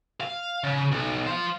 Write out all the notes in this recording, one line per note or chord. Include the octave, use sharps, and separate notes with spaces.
F5
C#3
B1
C5 F5